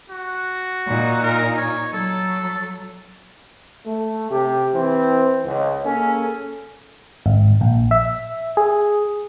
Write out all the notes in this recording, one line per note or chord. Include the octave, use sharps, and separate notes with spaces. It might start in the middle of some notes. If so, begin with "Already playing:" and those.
F#4
A#2 D#4
A#4
C#5
F#3 A4
A3
C3 G4
E3 C4
C#2
A#3 C#4 G#4 A4
G#1
A#1
E5
G#4